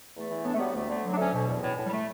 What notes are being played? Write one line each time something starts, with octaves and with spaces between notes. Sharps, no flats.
E2 A3
E3
A2 B3 D4
A3
F#3 G3 B3
D2 A3
D3 A3
F#3
D4
D2 A3 C#4
B2
E2
A2
A2
G3
A3